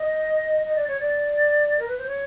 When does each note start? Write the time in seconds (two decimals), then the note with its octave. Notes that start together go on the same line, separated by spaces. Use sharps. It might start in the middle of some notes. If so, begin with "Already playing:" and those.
Already playing: D#5
0.65 D#5
0.76 D5
0.88 C#5
1.00 D5
1.79 A#4
1.87 B4
1.98 C5
2.07 C#5